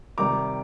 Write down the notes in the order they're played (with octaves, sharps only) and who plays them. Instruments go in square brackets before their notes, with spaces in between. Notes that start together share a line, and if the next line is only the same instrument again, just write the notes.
[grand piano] C3 D#3 G3 A#5 D6